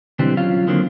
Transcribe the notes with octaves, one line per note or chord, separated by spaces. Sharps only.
B1 D3 E3 G3 C4
F#3 C#4 F4 F5
D3 D#3 F#3 A#3 C4